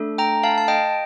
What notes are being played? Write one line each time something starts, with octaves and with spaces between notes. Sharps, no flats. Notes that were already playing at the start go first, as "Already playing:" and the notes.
Already playing: A3 D4 A4
G5 A#5
F5 A5
A5
D#5 G5